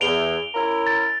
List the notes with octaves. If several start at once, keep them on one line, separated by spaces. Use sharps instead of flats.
E2 D7 F7 G7
C#4 E4 A#4
A6